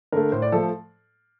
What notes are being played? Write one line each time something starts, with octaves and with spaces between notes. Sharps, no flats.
D3 A3 A#4
A2 C5
D5
F3 A3 A4